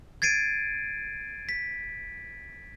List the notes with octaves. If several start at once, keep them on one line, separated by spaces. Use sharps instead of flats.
G#6 A6 C7 D7 D#7
B6